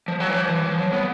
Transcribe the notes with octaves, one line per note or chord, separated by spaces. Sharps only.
F3
F#3
E3
F3
E3
F3
F#3
B3